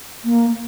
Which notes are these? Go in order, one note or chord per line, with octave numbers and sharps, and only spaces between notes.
A#3